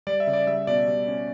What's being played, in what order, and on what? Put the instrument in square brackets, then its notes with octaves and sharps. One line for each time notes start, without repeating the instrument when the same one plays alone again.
[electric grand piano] G3 D5
E5
C#3
D5
G3 E5
B2 D5
G3
C#4